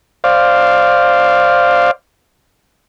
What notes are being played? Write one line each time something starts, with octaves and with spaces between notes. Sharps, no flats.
C5 D5 F5